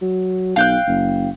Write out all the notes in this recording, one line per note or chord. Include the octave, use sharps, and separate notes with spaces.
F#3
B1 F5 G5 F#6
F#1